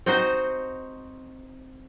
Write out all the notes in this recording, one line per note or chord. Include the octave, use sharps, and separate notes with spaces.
C4 D#4 F#4 C5